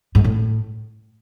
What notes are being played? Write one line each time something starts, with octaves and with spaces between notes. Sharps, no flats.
G#2
A2